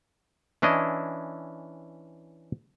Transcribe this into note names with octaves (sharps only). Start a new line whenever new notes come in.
E3 C#4 D4 E4 D#5